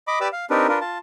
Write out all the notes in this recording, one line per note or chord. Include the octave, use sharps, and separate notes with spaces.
D#5 B5 D6
G4 B4 D5 D6 E6
F5
C4 D4 D#4 G4 A#4 B4
D4 F4 A#4 B4
F4 A5